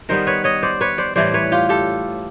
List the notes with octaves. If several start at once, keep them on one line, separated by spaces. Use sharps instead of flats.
D#3 G3 B3 A#4 C5
B4 C#5
C#5 D#5
C5 D5
B4 C#5
C5 D5
A2 E3 G3 C5 D5
B4 C#5
F4 G4
G4 A4